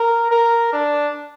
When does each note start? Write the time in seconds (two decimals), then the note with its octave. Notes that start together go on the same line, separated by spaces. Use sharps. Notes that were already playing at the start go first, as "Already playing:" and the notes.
Already playing: A#4
0.31 A#4
0.72 D4